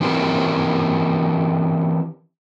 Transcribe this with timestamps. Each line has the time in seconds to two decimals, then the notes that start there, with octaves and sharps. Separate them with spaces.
0.01 E3 C4 C#4 E4 G4 A#4